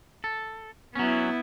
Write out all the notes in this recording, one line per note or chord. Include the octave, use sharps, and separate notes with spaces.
A4
F#3 B3 C#4 E4